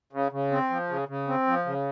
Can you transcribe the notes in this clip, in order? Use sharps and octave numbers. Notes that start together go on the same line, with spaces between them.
C#3
C#3
C4
F3
C#3
C#3
C4
F3
C#3